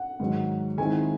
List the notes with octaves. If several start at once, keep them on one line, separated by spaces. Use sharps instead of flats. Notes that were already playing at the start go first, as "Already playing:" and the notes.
Already playing: F#5
G#2 D#3 F#3
D#3 G#3 C4 E4 G#5